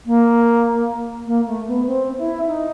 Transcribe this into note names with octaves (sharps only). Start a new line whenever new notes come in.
A#3
A#3
A3
B3
C4
E4
D#4